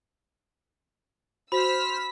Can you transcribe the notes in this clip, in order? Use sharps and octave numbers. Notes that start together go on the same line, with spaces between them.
F#4 C5 B5 E6 F6 B6